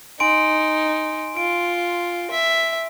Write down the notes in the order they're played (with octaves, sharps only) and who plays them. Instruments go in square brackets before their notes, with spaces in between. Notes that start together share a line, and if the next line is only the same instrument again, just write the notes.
[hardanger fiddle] D#4 [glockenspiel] G#5 C6 D7
[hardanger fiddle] F4 [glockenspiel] D7
[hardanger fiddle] E5